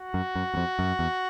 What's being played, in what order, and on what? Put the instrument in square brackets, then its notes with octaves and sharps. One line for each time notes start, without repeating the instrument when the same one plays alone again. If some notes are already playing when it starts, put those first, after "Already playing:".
Already playing: [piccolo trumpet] F#4
[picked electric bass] F#2
F#2
E2
F2
F#2
E2